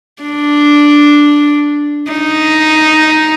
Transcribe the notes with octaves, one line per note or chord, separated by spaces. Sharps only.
D4
D#4